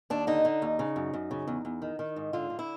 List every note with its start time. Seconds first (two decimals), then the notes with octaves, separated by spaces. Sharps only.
0.10 D#2 D4
0.27 D3 D#4
0.45 D3
0.62 D#2
0.79 C#3
0.96 F#2
1.14 F#2
1.31 C#3
1.47 E2
1.65 E2
1.82 D#3
1.99 D#3
2.16 G#2
2.33 D3 F4
2.50 D3
2.59 E4